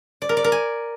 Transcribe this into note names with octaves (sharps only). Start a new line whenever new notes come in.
D5
A#4
D5
A#4
G#5